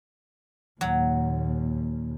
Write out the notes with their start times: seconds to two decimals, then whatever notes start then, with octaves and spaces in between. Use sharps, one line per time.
0.81 D#2 A#2 F#3